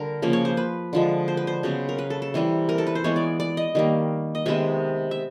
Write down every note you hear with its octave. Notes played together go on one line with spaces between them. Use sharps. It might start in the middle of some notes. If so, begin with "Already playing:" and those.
Already playing: D3 G3 A#4
C#3 F3 A#3
C#5
C5
B4
D3 F3 G#3
C5
B4
C5
C#3 F#3 B3
A#4
B4
A4
A4
C3 E3 G3
A#4
A4
B4
C5
E3 G#3 B3 C#5
D5
D5
D#5
D#3 G3 A#3
D#5
C3 D#3 G#3 B3 E5
E5